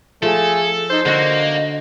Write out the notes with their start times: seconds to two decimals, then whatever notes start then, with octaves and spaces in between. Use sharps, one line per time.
0.22 F3 A3 G#4 A4
0.90 D#4 C5
1.05 D3 A#3 F#4 D#5